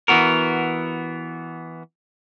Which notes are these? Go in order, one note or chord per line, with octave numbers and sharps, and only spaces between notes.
E3 B3 F#4 A#4